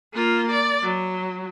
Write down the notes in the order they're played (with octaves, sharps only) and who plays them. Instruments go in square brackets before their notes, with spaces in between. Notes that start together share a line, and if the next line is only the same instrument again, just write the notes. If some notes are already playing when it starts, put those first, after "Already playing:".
[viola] A#3 F4
D5
F#3